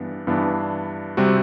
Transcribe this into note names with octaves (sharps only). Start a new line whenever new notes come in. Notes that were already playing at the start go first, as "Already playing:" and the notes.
Already playing: G2 E3 B3 D4
G2 E3 B3 D4
C3 G3 C4 F#4